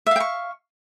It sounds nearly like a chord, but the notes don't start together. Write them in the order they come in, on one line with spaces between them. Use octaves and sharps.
E5 F5 G5 C#6